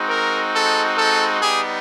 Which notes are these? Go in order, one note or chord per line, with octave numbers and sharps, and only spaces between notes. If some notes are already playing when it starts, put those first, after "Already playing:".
Already playing: G#3 C4 D#4 F#4
A#4
A4
A4
G3 B3 D#4 G4 G#4